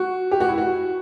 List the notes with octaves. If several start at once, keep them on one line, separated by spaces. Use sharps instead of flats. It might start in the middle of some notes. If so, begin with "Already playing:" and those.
Already playing: F#4
G4
F#4
E4
F#4